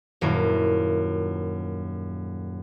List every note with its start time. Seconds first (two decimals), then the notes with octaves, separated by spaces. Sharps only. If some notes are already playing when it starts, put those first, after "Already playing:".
0.21 D#1 F#2 A#3 E4 C#6